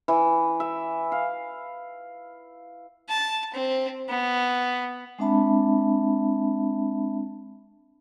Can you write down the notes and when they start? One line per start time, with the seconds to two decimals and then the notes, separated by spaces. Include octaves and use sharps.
0.08 E3
0.60 E5
1.12 F5
3.09 A5
3.54 C4
4.09 B3
5.18 G#3 C4 D4 E5 A5 B5